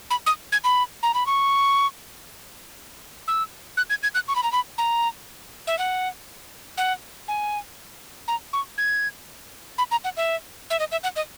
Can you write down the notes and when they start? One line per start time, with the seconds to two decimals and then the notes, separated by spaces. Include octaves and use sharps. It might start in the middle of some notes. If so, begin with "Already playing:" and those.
0.10 B5
0.26 D#6
0.52 G#6
0.64 B5
1.03 A#5
1.14 B5
1.26 C#6
3.28 E6
3.77 F#6
3.90 G#6
4.03 G#6
4.15 F#6
4.28 C#6
4.36 B5
4.43 A#5
4.52 B5
4.78 A#5
5.67 E5
5.78 F#5
6.77 F#5
7.28 G#5
8.28 A#5
8.53 C#6
8.78 G#6
9.78 B5
9.91 A#5
10.04 F#5
10.17 E5
10.70 E5
10.79 D#5
10.92 E5
11.03 F#5
11.16 D#5